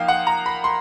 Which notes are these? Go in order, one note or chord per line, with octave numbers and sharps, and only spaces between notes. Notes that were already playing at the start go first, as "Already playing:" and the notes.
Already playing: F3 A#3 D#4 F5 G5
F#5
A#5
B5
C6